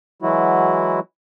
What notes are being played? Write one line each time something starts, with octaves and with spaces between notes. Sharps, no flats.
E3 F#3 G#3 E4 F#4